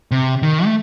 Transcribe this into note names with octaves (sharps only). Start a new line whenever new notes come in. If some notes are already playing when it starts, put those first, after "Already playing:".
C3
D#3
A3